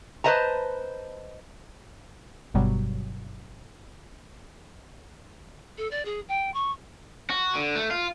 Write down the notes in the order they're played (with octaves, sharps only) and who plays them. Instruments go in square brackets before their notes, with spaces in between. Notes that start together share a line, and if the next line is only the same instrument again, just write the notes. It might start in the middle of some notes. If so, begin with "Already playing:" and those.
[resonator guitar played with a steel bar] B4 C5 D#5 A5 A#5
[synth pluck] G1 G2 B2 F#3 G3
[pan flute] A4
D5
G#4
G5
C#6
[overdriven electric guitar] F#4
D3
A3
F4